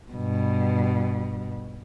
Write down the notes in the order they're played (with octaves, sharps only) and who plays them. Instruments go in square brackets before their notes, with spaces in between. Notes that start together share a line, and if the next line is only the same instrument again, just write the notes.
[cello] G2 B2